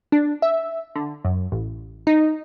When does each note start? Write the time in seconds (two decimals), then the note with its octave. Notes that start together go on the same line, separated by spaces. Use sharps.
0.12 D4
0.42 E5
0.96 D3
1.25 F#2
1.52 A1
2.07 D#4